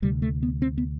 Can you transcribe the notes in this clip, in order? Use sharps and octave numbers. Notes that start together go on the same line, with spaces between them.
D2 C3 G3
A3
B3
C4
B3